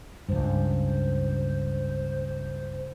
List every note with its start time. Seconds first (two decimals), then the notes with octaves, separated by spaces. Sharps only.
0.29 C#2 G2 C5